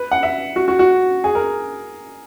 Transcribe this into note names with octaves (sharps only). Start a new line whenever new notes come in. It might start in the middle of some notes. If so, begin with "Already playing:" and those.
Already playing: B4
F#5
E5
F#4
F#4
F#4
G#4
A#4